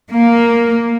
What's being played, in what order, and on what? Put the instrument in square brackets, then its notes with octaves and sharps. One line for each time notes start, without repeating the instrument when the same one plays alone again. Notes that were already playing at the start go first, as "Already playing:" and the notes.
[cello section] A#3